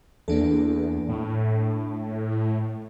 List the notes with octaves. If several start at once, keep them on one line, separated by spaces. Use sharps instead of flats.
E2 A#3 D4 A4
A2